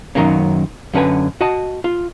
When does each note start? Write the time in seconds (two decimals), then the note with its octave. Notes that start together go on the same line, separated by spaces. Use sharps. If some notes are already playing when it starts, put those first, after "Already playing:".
0.15 F#2 A2 D#3 F#3 A#3 C#4
0.94 F#2 D3 C#4 B4 G#5
1.41 F#4 D#5 A5
1.84 F4